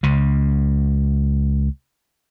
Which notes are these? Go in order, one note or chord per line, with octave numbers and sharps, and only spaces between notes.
C#2 C#3